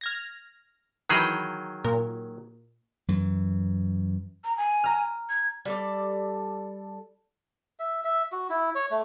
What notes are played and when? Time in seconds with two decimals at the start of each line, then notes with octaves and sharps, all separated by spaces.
0.01 F6 G#6 A#6
1.09 D#3 E3 F#3 G#4 B5 G6
1.84 A#2 A#4
3.08 F#2 E3
4.44 A#5
4.57 G#5
4.84 A#5 F6
5.29 G#6
5.65 G3 A4 D5
7.79 E5
8.04 E5
8.32 F#4
8.50 E4
8.75 C#5
8.91 A3